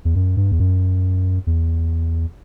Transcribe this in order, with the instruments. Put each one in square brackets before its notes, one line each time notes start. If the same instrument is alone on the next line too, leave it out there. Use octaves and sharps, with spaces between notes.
[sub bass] E2
F#2
G2
E2
F#2
E2